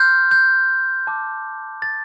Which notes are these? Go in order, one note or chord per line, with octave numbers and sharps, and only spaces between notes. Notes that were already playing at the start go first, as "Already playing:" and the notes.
Already playing: C6 F6 G6
G6
A5 D6 G6
A6